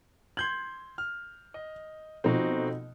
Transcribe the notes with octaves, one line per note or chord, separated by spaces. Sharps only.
C6 G6 G#6 F#7
F6
D#5
B2 F3 A3 C4 D#4 F#4